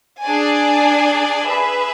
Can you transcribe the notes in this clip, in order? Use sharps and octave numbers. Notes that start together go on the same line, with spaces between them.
D4 G#4 D5 G#5
G#4 B4 E5